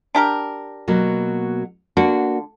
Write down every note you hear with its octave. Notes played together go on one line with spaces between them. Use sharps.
D4 G4 A#4
B2 F#3 A#3
D3 A#3 D4 F#4